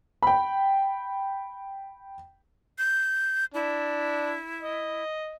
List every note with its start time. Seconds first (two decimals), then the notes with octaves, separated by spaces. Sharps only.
0.23 G5 B5
2.78 G6
3.54 D4 E4
4.62 D#5